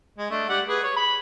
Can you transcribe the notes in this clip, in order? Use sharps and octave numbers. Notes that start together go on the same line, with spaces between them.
G#3
A3 D4
G3 D5 F#5
G#4 B4
C#5
B5